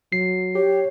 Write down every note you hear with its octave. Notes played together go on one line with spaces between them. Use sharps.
F#3 C7
G4 C#5